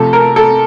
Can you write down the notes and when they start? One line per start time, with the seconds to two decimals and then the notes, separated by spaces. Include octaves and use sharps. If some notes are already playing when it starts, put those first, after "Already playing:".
Already playing: C3 F3 A3 A4
0.13 A#4
0.36 A4